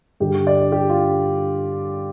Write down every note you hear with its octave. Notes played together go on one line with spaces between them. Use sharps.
G2 D3 G3 G4
D5
G4
F4